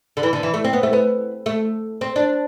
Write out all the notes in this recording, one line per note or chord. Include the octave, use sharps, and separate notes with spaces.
D3
E3
D3
E3
A3
C4
B3
A3
B3
A3
C4
D4